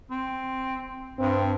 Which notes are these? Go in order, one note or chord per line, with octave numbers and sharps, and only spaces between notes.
C4
G2 C4